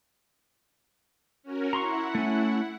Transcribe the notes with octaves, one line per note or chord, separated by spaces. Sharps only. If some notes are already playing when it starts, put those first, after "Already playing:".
C#4 F#4 A#4
E4 F#5 A#5 C6 C#6
A3 C#4